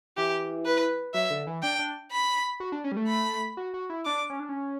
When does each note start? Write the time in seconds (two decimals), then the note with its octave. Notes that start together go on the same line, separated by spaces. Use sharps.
0.17 E3 G4
0.66 B4
1.14 F#3 E5
1.30 D3
1.47 E3
1.63 D4 G5
1.79 D4
2.12 B5
2.60 F#4
2.72 D4
2.84 C#4
2.92 G3
2.97 A3
3.08 B5
3.57 F#4
3.74 F#4
3.90 E4
4.06 D4 D6
4.30 C#4
4.40 D4
4.49 C#4